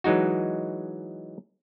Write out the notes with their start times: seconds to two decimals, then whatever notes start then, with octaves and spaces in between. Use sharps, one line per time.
0.04 E3 F#3 G#3 D#4 F#4